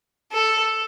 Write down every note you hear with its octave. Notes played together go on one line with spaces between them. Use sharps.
A4